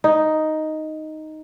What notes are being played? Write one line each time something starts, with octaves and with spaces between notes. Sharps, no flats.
D#4